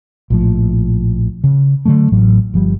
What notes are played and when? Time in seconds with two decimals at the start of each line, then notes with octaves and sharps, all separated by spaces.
0.30 A#1 A2 F3
1.44 C#3
1.86 D3 E3 F#3 A3
2.12 A1 A2 F#3
2.54 G1 F3 G3